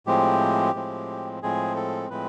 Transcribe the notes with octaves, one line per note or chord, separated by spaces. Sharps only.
A2 F3 G#3 C4 G4
A2 F3 G#3 C4
A2 F3 G#3 C4 G#4
A4
A2 F3 G#3 C4 B4